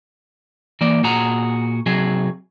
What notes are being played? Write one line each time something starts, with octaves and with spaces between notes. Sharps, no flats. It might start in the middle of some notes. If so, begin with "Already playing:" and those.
E3 A#3 D5
A#2 F#4 G#4 A#5
C3 F#3 G#4